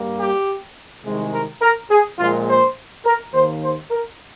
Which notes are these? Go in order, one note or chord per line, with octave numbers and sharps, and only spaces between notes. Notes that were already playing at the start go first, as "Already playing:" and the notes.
Already playing: G2 G3 A#3
G4
C2 C3 D#3 G#3
A#4
A#4
G#4
A#1 A#2 G#3 F4
C5
A#4
D#2 D#3 A#3 C5
C5
A#4